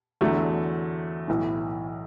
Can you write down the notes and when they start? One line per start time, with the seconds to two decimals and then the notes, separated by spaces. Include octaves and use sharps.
0.21 E2 D3 F#3 A3
1.28 B1 A2 E3